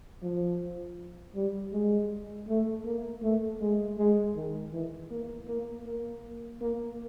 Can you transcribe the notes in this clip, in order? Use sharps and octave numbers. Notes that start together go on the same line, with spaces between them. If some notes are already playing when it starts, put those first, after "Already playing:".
F3
G3
G#3
A3
A#3
A3
G#3
G#3
D#3
E3
A#3
A#3
A#3
A#3